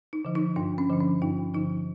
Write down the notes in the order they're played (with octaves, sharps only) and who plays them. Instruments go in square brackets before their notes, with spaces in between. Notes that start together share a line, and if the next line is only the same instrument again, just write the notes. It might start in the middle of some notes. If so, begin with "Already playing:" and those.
[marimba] D#4
D3 F3
D#4
G2 D4
C#4
D3 F3 D4
C#4
G2 D#4
D3 F3 D#4